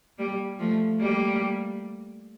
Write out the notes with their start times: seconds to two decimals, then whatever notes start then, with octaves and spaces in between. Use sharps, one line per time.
0.18 G3 A#3
0.59 F3 A3
1.00 G3 A#3